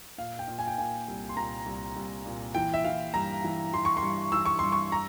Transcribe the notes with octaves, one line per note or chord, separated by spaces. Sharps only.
A#2 F5
G5
A#2
G#5
G5
A#2 G#5
C2
C6
A#2 A#5
C2
C2
A#2
E3 G5
E5
E3 F5
G2 A#5
E3
E3 C6
C#6
C6
G2
E3 E6
C#6
G2 C6
C#6
A#5